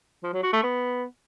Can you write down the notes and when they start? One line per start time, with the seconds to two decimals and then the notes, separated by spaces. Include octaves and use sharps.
0.23 F3
0.33 F#3
0.43 F#4
0.53 A3
0.63 B3